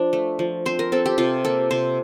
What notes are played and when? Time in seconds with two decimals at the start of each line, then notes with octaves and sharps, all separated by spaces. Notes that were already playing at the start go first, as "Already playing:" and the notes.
Already playing: F3 D4
0.13 A3
0.39 F3
0.65 C4 C5
0.79 A#4
0.92 C4 A4
1.06 G4
1.18 C3 F4
1.45 A#3 A4
1.71 C3 C5